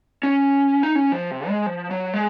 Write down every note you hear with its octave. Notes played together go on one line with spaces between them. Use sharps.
C#4
D#4
C#4
F3
C3
G#3
F3
F#3
G#3